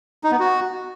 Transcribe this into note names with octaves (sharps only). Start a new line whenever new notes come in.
D#4
B3
F#4